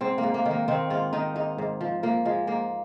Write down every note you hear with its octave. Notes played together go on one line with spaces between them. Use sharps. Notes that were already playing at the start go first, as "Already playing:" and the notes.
G#2 C4
A#3
G#2
A#3
D#3
A#3
D#3 C4
G#2 F4
D#3 D#4
G#2 D#4
G#2
F3
F3 A#3
F3 G#3
G#2 A#3